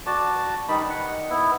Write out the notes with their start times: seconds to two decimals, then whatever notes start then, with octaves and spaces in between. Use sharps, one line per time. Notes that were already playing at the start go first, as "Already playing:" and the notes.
0.06 F#4 D5 A5
0.68 D#3 G3 D#4 B5
0.90 F#5
1.30 B3 E4